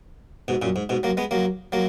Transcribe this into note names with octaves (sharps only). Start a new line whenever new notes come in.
G#2 B2
F#2 A#2
G#2
G#2 B2
F#3 A#3
G#3 B3
F#3 A#3
F#3 A#3